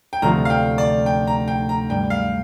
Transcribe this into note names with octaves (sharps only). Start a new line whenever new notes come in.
G5
D2 C3 F3 C4 F4 A#5
F5
G5
D5
G5
A#5
G5
A#5
G2 G3 D4 G5
F5